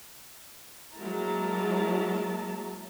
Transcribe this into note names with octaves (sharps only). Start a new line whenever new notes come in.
F#3 G#3 A#3 E4 A5 A#5